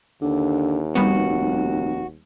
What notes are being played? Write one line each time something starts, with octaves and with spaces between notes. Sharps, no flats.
D#2 D3
F1 G3 B3 F#4